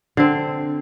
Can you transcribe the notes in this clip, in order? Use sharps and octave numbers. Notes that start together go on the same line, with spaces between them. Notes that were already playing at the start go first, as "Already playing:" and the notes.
D3 C4